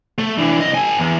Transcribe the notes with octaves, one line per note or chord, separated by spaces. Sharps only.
A3
E3 D4
C2 D#5
A4 G#5
E2